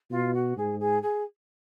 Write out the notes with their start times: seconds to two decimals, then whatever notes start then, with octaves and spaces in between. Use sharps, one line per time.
0.11 B2 F4
0.34 F#4
0.57 G#2 G#4
0.80 G#4
1.02 G#4